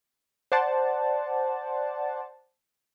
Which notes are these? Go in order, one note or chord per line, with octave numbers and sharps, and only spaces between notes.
C5 D5 F#5 A5